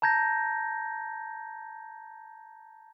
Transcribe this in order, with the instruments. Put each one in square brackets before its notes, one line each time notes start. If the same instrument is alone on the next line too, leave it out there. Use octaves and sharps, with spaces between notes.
[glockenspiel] A5 A#5 G6 G#6 A#6